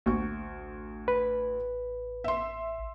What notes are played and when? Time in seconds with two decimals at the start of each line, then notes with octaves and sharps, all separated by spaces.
0.06 A1 D2 C#6
1.08 B4
2.24 E5 C6